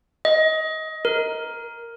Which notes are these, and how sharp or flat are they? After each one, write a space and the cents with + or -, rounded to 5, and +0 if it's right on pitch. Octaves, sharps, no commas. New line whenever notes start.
D#5 +25
A#4 +5